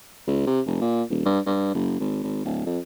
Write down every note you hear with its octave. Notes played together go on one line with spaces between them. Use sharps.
C#2
C3
F1
A#2
D#1
G2
G2
F#1
G#1
G#1
D1
F2